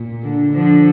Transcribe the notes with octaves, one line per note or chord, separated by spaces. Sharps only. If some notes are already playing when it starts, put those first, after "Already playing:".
Already playing: A#2
D3
D3 F3